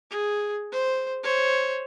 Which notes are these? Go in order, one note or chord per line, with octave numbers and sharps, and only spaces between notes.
G#4
C5
C5 C#5